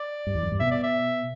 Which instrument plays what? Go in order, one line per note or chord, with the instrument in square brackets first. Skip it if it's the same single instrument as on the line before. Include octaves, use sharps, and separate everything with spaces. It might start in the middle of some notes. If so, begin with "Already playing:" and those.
Already playing: [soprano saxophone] D5
[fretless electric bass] G2
E2
F#2
G2
[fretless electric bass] B2 [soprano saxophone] E5
[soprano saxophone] D5
E5